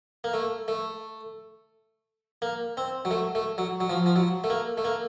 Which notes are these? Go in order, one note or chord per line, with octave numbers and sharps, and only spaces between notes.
A#3
A3
A3
A#3
C4
F#3
A3
A3
F#3
F#3
F3
F3
F#3
A3
A#3
A3
A#3